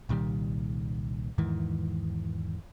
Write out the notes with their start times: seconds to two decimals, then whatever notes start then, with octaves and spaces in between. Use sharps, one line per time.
0.09 C2 A#2 D#3 G3
1.38 E2 G#2 D#3 E3